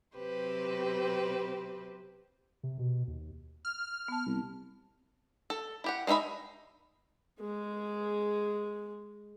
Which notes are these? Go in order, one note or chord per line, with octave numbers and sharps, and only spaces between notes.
C3 F#3 C4 G4 B4 C5
C3
B2
D#2
F6
B3 A5
C2
A4
E4 G4 F#5
G#3 C#4 D#4 E5 B5
G#3 G#4